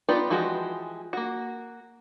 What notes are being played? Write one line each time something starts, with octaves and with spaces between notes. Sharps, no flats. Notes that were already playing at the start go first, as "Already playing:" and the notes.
B3 D#4 F4 G4 D5
E3 F3 G#3 F#4 G4
A#3 F#4